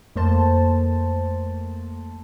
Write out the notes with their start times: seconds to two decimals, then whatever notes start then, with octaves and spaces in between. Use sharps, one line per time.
0.16 F2 A3 A#3 C5 A5